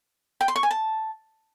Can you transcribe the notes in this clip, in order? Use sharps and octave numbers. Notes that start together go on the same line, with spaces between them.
G5
C6
C#6
G#5
A5